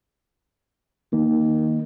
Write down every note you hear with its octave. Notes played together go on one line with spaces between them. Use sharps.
D#3 A#3